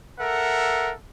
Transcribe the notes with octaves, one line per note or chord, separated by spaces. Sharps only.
A4 A#4 E5 F#5